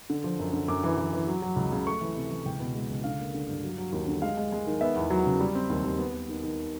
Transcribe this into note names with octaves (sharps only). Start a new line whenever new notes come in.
D3
F3
F#2
D3
F#2 D6
E3
E3
E3
F#3
F#3
C#2
C#3
A3 C#6
E3
C3
E3
C#2 G5
B2
G#3
C#2
D3 F5
A#3
D3
G2
F#3
F#3
D#2
D3
G#3 F5
G#3
G#3
D#3
B3 E5
E2
F#3
C#3
G3
C4
D#2
D#2
B3
B3
D#3
D#3